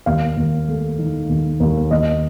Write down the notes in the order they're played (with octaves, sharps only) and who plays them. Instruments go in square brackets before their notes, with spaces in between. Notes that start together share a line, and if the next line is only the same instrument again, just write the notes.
[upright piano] D#2 F5
D#2
A3
D#3
D#2
D#2
D#2 D#5